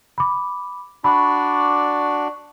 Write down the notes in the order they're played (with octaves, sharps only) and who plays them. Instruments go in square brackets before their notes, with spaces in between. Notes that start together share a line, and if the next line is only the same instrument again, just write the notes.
[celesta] B5 D6
[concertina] D4 F#4 D5 [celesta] B5 C#6 D6